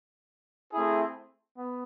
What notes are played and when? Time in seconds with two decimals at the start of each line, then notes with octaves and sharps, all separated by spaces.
0.73 A3 C4 E4 G#4
1.55 B3